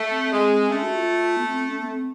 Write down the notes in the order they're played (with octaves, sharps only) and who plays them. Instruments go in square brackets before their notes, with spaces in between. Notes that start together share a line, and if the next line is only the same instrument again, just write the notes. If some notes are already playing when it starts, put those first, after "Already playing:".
Already playing: [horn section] A3
[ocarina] C4
[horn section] G#3
[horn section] A3 [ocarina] C#4
[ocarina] F#4
F4
B3
C4
C#4
B3
C4